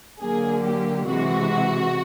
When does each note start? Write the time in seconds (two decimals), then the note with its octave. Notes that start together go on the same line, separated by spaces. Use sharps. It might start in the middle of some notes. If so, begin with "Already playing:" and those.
0.21 D3 F#3 A#3 G#4
0.64 G4
1.07 C3 E3 G#3 F#4